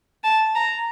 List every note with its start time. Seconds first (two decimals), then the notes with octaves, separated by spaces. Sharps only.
0.24 A5
0.55 A#5